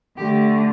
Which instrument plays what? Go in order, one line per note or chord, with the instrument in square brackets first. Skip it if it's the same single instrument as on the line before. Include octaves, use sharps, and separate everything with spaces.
[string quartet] D3 A3 G4